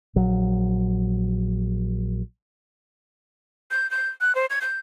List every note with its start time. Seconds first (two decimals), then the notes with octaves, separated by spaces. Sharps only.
0.16 A#1 F#3
3.71 G6
3.91 G6
4.21 F#6
4.35 C5
4.50 G#6
4.61 G6